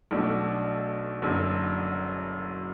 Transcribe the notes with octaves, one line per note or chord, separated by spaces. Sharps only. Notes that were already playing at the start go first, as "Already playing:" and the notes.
B1 B2 A3 D4
F#1 F#2 D3